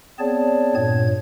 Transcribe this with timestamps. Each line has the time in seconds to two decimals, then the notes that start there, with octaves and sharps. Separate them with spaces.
0.19 B3 C4 G#4 C#5 D5 A5
0.75 G2 A#2 C#5 G#6